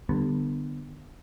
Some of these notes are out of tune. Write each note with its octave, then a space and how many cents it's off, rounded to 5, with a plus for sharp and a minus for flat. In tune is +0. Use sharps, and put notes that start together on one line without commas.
D3 +25 G3 +0 B3 +0